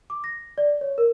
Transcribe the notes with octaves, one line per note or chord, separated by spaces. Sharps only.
D6
A#6
D5
C#5
A#4